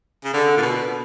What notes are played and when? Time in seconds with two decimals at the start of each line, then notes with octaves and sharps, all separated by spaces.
0.24 C#3
0.34 D3
0.57 A#2
0.62 B2